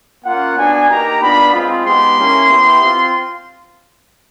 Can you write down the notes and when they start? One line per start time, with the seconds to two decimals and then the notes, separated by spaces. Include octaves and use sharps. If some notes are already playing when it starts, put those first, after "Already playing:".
0.23 A#3 C#4 F4 F#5
0.56 B3 D4 F#4 G#5
0.89 A#3 D#4 G4 A#5
1.21 B3 D4 F4 B5
1.52 G#3 C4 F4
1.85 G#3 B3 D#4 G4 C6
2.17 A#3 C#4 E4
2.49 B3 E4 G4
2.82 C4 F4